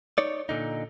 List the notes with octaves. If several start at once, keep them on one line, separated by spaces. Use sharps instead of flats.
D#4 C#5 D5
A#2 D3 D#4